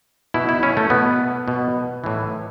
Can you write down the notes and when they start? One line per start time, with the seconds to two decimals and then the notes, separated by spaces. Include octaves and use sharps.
0.34 B2 E4
0.49 E4
0.63 C#4
0.77 A3
0.90 B2 B3
1.48 B2
2.04 A2 E3